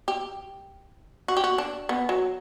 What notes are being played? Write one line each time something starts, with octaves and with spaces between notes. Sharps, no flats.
G4
F#4
G4
F#4
D4
B3
F#3